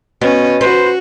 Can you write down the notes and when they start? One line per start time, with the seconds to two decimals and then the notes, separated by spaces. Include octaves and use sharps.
0.21 B2 B3 C#4
0.61 F#4 B4 C5